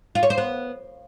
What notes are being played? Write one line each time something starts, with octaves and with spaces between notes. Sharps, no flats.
F4
C#5
C5
B3